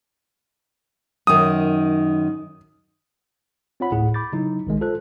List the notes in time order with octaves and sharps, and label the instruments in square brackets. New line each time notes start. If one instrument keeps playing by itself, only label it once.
[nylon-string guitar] F#2 D#3 [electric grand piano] D#6
[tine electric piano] C4 F4 C#5 F#5 B5
G1 D2 A2 E4 G#4 F#5
B5 D6 G6 A6
C#3 F#3 D#4 E4
B1 D#3 G#3
F4 A4 C5 F#6